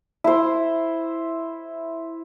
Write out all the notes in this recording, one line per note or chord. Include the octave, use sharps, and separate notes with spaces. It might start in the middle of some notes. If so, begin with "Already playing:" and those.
E4 C5